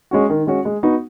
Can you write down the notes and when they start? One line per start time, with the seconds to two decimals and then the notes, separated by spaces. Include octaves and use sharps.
0.11 G#3 C#4 F#4
0.30 D#3
0.47 G#3 C#4 F#4
0.65 G#3
0.83 B3 D#4 F#4